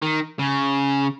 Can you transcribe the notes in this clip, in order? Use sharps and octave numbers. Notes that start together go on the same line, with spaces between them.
D#3
C#3